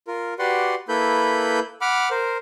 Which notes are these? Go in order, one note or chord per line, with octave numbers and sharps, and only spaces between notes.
F4 A#4
F#4 G4 B4 D5 F#5 C6
A#3 E4 A4 B4 B5 G6
F#5 B5 D6 F6
A#4 C5